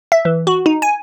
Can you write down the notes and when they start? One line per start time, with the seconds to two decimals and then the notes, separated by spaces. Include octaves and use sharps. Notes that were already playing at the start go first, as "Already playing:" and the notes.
0.12 E5
0.25 E3
0.47 F#4
0.66 D#4
0.82 G#5